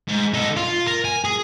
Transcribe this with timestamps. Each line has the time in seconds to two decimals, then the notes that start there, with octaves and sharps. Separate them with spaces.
0.08 G#2
0.34 D#4 A4
0.57 F4
0.87 A#4
1.05 G#5
1.25 G#4